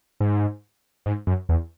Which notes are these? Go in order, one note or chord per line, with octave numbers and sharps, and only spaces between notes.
G#2
G#2
F#2
E2